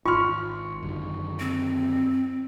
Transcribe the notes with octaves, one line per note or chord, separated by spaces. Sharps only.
G#1 F4 C6 C#6 F6
F#2 D3 D#3
C4